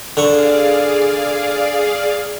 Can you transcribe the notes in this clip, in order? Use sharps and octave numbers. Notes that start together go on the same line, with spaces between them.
D3 G#4 D5 F5 C#6